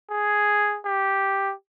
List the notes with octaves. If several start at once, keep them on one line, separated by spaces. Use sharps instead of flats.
G#4
G4